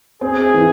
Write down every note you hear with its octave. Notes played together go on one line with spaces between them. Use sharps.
C4 G#4
E3